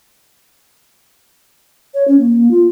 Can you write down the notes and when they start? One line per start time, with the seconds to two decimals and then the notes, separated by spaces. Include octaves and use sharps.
1.94 C#5
2.08 C#4
2.19 A#3
2.51 F4